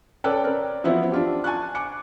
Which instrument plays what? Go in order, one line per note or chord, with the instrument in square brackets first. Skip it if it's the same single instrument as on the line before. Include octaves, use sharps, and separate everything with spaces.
[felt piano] C#4 A4 B4 D5 G5 F#6
C4 A#4 D5
E3 F3 B3 C4 E4 F#4
D4 F4 G4
G#5 A5 C#6 F#6
D6 F#6 C#7